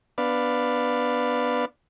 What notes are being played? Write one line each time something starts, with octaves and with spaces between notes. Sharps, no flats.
B3 D4 B4 D5 F5